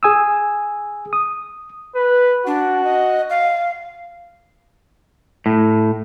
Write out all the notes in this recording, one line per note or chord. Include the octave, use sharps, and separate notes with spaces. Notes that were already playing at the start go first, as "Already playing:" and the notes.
G#4 G#5 D#6 E6
D#6
B4
D4 F#4
D#5
F5
A2